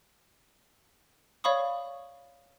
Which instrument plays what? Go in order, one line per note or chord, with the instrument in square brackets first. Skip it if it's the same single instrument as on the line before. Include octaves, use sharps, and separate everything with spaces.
[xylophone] C#5 D5 F5 B5 C#6 D#6